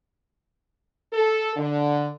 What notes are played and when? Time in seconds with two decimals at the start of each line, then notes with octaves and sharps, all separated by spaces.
1.12 A4
1.56 D3